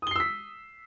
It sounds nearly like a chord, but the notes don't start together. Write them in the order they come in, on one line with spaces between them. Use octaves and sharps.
D#6 G7 C7 E6 B6